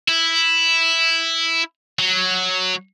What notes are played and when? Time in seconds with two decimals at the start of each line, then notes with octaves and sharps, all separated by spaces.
0.08 E4
1.99 F#3